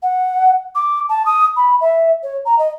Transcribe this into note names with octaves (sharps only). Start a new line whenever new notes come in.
F#5
D6
A5
D#6
B5
E5
C#5
A#5
D#5